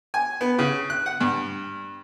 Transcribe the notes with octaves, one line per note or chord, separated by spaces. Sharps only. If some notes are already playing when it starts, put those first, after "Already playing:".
G#5
B3
C#3
F#6
F#5
G2